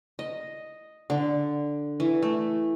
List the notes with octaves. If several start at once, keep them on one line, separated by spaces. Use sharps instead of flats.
D#5
D3
E3
A3